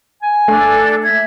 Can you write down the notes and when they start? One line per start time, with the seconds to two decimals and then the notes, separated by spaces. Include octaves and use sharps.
0.22 G#5
0.48 A3 D4 A4
1.03 E5 G#6